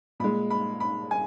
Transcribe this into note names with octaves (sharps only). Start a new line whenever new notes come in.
A#2 G#3 B5
B5
B5
G#5